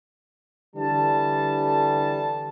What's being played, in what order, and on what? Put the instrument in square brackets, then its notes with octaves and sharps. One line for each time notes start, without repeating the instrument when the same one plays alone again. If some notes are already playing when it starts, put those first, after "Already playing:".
[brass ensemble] D3 E3 G3 A5